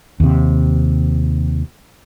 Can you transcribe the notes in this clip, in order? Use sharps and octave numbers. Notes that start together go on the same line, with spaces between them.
D#2 C3